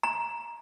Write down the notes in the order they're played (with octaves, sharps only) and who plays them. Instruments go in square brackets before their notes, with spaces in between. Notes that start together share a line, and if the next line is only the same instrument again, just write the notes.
[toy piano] A#5